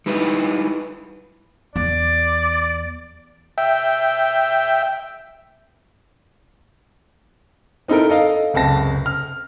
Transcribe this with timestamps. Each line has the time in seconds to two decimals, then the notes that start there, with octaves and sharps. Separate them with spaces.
0.06 G3 D#4 E4 B4
1.76 E2 D5
3.58 E5 G5
7.88 C4 D#4 E4 A4 A#4
8.09 A4 D#5 F5
8.54 F#1 C#2 C3 A5 A#6
9.06 F6